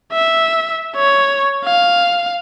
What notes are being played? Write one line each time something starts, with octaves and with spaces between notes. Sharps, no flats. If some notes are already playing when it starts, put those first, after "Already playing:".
E5
C#5
F5